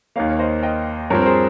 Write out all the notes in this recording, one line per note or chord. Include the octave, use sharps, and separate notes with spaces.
D#2 D#3 A#3 C#5 F5
C#5
C5 D#5
D#5 G5
G2 F3 C4 A#4 C#5
A#4
G#4 C5